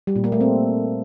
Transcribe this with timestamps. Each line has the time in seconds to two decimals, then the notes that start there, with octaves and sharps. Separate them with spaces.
0.07 G3
0.16 A#2
0.24 A#3
0.32 A3
0.41 C4